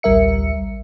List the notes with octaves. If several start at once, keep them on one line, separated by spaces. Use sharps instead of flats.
A1 D2 G3 A#4 E5 C#7